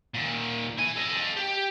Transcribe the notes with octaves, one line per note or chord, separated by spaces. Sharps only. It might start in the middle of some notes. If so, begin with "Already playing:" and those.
A#2 D#3
E4 G#5
A4 D#5
G4